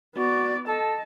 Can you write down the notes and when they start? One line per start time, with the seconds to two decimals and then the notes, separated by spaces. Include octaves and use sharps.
0.15 B3 F#4 D5
0.68 A4 D#5 A5